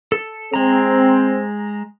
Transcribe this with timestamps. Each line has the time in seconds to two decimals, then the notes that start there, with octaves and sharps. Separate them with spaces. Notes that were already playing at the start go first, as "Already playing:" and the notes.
0.12 A4
0.54 G#3 C4 A#5